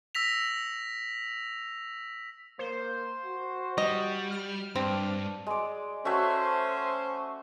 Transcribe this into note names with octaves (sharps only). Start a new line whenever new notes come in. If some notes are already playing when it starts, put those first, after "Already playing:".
E6 A#6 B6 F7
A#3 C5
F#4
G3 D#5
F6
G2 C4 D4
G#3 D5
A3 C#4 F#4 C5 E5